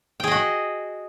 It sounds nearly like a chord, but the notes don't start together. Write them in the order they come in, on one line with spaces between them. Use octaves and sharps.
G5 G#4 D#5 F#4